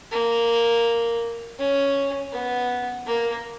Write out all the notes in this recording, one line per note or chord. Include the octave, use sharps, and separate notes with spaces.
A#3
C#4
B3
A#3